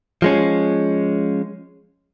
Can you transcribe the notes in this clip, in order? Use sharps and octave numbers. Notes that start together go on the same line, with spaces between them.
F3 G#3 C#4